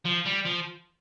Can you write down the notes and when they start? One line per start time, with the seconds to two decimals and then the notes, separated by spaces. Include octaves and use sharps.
0.05 F3
0.25 G3
0.45 F3